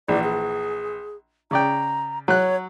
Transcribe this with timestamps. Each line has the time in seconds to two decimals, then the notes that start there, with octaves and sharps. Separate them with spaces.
0.08 A#1 E3 D5
0.23 G#4
1.51 C#3 D5 G5 A#5
2.28 F#3 C#5 F#6